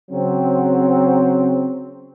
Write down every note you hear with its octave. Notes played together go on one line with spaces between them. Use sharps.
C#3 F#3 C4